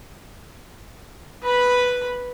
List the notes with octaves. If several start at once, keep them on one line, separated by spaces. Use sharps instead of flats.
B4 B5